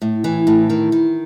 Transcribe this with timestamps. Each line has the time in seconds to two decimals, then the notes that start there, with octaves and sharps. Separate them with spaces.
0.02 A2
0.24 E3
0.47 A2
0.70 D#3
0.92 D#3